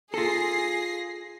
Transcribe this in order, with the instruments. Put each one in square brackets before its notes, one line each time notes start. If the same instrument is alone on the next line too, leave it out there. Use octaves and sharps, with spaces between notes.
[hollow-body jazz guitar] F4 A4 [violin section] G#4 A#6 C7